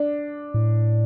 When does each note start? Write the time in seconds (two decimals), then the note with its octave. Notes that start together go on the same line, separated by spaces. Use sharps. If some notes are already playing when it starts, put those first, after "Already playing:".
Already playing: D4
0.54 A2